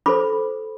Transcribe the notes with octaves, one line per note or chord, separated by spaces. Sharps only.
F4 A4 C5 B5 D6